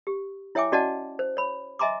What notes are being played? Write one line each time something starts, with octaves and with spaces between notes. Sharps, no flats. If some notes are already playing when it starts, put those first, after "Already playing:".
G4
E4 C#5 E5 G5 G#5 D6
C#4 F#4 D5 D#5 F#5 A5
C5
C#5 B5
D#5 E5 G#5 A#5 C6 D6